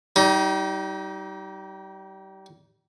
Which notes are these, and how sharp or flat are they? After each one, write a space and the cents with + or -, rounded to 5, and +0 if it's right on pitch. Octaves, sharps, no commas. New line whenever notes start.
G3 -25 D#4 +25